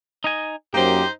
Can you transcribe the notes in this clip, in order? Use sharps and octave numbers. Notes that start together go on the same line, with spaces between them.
D#4 D#5 G#5
F#2 A#3 D#4 G4 C5